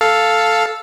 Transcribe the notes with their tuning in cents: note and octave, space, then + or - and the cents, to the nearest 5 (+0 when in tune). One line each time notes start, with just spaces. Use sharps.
A4 +0 F5 +0